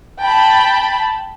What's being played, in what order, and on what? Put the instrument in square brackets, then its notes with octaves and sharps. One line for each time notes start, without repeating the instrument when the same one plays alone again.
[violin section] G5 A5 B5